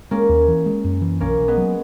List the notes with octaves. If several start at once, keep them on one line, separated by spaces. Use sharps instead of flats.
G#3 A#3 C#4
D#2
E3
G#3
F#2
E3
B1 A#3 C#4
B1
G#3 B3
F#3